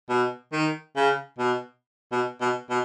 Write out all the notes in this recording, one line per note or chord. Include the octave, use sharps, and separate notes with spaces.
B2
D#3
C#3
B2
B2
B2
B2